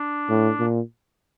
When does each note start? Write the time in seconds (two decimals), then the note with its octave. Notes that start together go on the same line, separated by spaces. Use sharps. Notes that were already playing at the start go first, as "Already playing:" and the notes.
Already playing: D4
0.29 A2
0.60 A#2